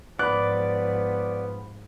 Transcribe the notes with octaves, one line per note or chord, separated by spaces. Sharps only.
G#2 F3 B3 D5 B5 F#6